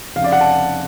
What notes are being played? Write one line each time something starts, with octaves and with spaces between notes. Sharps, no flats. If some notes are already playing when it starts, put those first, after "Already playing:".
F1 F2 C#3 F5
D5
F#5
A5